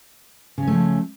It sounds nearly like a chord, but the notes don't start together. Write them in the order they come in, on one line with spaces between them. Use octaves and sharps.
C#3 C#4 A3 F3